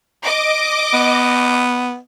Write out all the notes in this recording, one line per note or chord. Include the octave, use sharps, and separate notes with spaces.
D#5 D6
B3